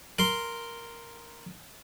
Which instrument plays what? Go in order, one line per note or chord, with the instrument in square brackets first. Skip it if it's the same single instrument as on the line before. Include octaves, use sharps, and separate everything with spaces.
[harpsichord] A#4 C6